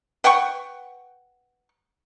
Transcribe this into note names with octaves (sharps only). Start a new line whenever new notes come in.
B4 F#5 G5 C#6